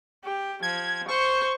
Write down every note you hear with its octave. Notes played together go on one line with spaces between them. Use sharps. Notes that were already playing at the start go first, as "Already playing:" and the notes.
G4
F3 G#6
C5 C#6